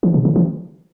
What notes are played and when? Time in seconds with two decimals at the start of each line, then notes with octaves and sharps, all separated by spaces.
0.03 E3
0.14 C3
0.25 C#3
0.36 E3